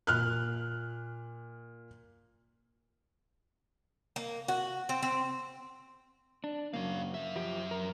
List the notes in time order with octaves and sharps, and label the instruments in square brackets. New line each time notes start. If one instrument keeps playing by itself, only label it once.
[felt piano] A#2 F6 F#6
[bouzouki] A#3
F#4
C4
C4
[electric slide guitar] D4
[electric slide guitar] F#2 C#3 A#3 [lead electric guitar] D4 F5
[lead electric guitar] F#2 E5
[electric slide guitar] F3 G4
A#4